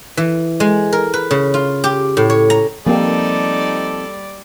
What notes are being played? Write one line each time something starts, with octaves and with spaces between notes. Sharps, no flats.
E3
G#3
A#4
B4
C#3
F4
G4
A2
C#5
A#5
F3 G3 A#3 C4 D#4 G4 A4 D5